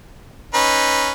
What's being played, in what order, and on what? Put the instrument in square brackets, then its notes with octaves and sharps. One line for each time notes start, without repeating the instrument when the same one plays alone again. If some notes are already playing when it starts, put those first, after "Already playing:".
[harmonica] C#4 D#4 B4